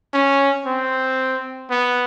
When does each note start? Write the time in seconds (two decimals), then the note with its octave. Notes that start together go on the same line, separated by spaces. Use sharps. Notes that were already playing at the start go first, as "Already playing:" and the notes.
0.14 C#4
0.66 C4
1.70 B3